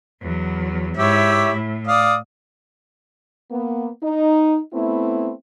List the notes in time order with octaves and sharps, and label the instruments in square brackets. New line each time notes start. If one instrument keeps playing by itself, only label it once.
[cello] E2 F#3
[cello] G#2 E4 [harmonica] G4 C#5 E5
[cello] A2
[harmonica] D5 F5 D#6
[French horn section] A#3 B3
D#4
A3 B3 C4 E4